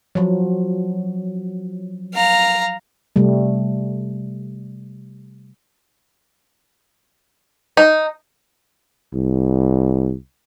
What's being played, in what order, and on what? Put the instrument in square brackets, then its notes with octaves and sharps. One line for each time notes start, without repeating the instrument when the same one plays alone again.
[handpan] F3 F#3
[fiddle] F5 A#5
[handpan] C3 G3 A3
[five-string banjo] D#4
[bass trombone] C2